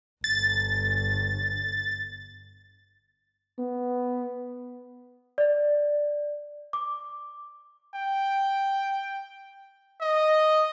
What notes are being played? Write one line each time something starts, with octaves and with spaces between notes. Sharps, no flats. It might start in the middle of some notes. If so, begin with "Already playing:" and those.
G1 A6
B3
D5
D6
G5
D#5